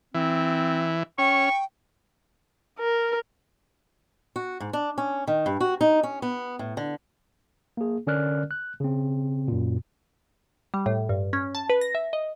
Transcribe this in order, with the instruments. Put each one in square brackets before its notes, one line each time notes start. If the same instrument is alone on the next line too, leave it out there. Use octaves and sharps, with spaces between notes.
[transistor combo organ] E3 [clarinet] C4
[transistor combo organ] C#4 [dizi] G5 [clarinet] C#6
[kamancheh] A#4
[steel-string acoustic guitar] F#4
G#2
D4
C#4
D#3
G2
F#4
D#4
C#4
B3
A2
D3
[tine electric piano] A#3 G#4
D3 C#4 A#4 D5 F6 F#6
F#6
C#3 C4
F#2 A#2
[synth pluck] G3
A2
G2
C#4
A5
B4
A#6
E5
D#5